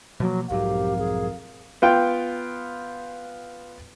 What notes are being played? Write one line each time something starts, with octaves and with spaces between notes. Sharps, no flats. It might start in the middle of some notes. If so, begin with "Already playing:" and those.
B2 F3 F#3 A#3
B1 F2 G#2 F#3 G4 A#4 F5
G#4
B3 F4 G5